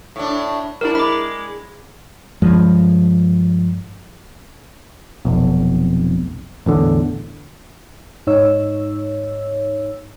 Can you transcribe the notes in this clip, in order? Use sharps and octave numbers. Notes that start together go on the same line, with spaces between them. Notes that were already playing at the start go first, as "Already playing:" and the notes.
A2 D4
G#2 G3 D4 E4 A#4
G#3 B5 D6
G2 F3 G#3
F1 B1
A1 E2 D3
G#2 D#4 C#5 E6